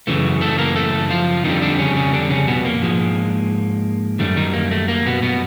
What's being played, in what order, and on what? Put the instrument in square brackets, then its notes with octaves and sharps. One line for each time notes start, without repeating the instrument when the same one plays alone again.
[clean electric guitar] F#2 C#3 E3 A3
A3 A4
A#3 A#4
A3 A4
F3 F4
F2 D3 D#3 G3 D#4
D3 D4
C#3 C#4
C#3 C#4
D3 D4
C#3 C#4
B2 B3
A#3
G#2 F3 G#3
F#2 D#3 G3 A3
D#3 D#4
A#3
A3
A#3
B2 B3
B2 B3